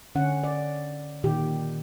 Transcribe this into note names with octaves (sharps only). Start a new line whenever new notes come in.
D3 C#4 F#5
D5
A#2 D#3 G4